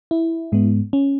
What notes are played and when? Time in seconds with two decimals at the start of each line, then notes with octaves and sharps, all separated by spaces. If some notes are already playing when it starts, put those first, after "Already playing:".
0.11 E4
0.52 G#2 G#3 B3
0.93 C#4